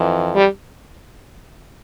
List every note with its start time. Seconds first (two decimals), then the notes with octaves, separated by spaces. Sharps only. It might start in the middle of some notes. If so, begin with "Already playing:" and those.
Already playing: F2 E3
0.34 G3